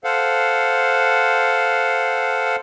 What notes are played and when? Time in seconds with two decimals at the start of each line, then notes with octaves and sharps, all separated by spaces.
0.04 A4 C5 F5 F#5